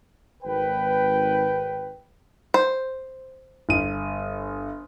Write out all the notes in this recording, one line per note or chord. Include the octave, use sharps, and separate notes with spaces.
G#1 B4 G5
C5
G1 D#7